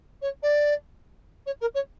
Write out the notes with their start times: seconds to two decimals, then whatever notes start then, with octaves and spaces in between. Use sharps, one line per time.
0.21 C#5
0.42 D5
1.46 C#5
1.60 A#4
1.74 C#5